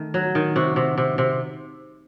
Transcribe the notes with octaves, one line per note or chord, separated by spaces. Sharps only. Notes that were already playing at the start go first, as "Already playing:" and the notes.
Already playing: D#3 A3
F#3
D#3
C3 F#4
C3
C3
C3